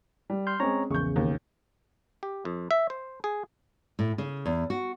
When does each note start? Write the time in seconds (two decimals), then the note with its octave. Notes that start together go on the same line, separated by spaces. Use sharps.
0.30 G3
0.47 C6 F6 G6
0.60 G#3 C4 C#4 C#5 A#5 C#6
0.90 A#1 E2 C#3 C#6 G6
1.16 D#2
2.23 G4
2.45 F2
2.71 E5
2.90 C5
3.24 G#4
3.99 A2
4.18 C#3
4.46 E2
4.70 F#4